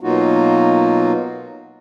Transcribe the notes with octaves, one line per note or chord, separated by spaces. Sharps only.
B2 F#3 A#3 D#4 F4 F#4